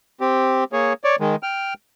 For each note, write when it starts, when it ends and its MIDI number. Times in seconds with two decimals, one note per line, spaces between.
0.21 0.64 60
0.21 0.64 67
0.73 0.93 58
0.73 0.93 68
0.73 0.93 73
1.04 1.16 73
1.04 1.16 74
1.20 1.36 51
1.20 1.36 56
1.43 1.74 79
1.43 1.74 89